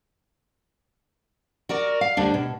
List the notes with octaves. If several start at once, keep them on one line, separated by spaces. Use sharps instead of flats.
F#4 A#4 D5
F5
D2 G3 D4
B2